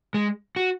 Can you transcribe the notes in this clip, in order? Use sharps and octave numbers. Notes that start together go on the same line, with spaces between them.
G#3
F#4